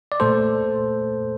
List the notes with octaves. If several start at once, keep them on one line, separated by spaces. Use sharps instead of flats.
D5
A#2 A3 A4 C5